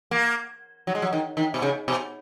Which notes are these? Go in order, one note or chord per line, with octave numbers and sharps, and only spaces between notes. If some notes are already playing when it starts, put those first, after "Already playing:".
A#3
F#3
G#3
F#3
D#3
D#3
B2
C#3
B2